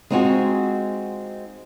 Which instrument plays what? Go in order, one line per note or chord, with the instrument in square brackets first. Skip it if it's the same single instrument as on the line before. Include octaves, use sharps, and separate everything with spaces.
[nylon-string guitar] G#3 C4 D#4 F4 F#4 G#4